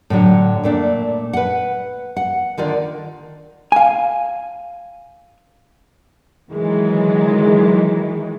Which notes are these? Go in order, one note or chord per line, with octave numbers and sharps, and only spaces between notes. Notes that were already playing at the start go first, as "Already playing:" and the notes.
A2 D3 F#3
A#2 A3 D4
B4 F#5
F#5
D3 D#3 F4 D5
F5 G#5
D#3 E3 F#3 G#3